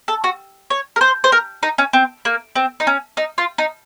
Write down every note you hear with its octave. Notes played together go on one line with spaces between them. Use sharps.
A4
F#4
C#5
A#4
C5
C5
A#4
D#4
C#4
C4
A#3
C4
D#4
C#4
D#4
F4
D#4